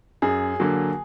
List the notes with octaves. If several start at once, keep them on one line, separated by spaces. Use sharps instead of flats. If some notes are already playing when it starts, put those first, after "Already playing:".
F#2 G#4
D3 F#3 A#3